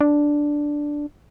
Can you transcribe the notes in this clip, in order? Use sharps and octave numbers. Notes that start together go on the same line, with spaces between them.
D4